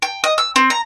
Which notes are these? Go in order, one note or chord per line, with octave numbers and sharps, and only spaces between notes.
G5
D#5
E6
C4
A#5